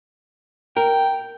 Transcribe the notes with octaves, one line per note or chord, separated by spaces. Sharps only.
A#4 G5